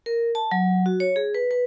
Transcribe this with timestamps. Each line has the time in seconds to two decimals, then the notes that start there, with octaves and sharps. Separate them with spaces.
0.06 A#4
0.35 A5
0.51 F#3
0.86 F#4
1.00 C#5
1.16 G#4
1.35 B4
1.51 B4